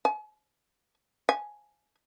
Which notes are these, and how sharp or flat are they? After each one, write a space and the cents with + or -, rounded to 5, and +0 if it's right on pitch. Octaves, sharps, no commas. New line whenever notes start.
G#5 +40
G#5 +5